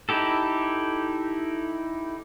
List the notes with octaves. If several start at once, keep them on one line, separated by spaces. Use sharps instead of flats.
D#4 E4 G4 A4